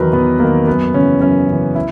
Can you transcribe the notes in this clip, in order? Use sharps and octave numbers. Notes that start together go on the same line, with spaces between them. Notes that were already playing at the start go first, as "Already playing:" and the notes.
Already playing: E2 D#3 F#3 A#4 B4
E2 B3
D#3 F#3 A#3
F#2 B3
C#3 E3 C#4
F#2 C#4
C#3 E3
E4